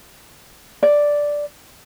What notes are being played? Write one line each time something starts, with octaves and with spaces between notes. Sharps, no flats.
D5